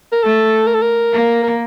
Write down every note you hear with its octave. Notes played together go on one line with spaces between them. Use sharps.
A#4
A3 A4
A#4
A4
A#4
A#3
A#4